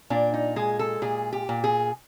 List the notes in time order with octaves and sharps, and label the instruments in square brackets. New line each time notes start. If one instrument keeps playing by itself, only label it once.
[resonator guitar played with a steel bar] A#2 D4
D#4
G#3 G#4
A4
A#2 G#4
G4
A#2
G#4